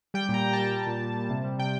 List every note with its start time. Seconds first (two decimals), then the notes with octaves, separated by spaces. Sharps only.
0.14 G3 G5
0.29 A#2 A#5
0.43 A#2
0.53 A5
0.58 G3
0.72 G3
0.87 A#2
1.01 A#2
1.16 G3
1.30 C3
1.44 G3
1.59 C3 G5